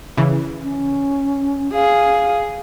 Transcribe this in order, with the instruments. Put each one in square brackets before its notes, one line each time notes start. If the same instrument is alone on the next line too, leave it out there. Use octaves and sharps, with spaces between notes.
[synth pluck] C#3 E3
[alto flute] C#4
[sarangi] G#4 [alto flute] F5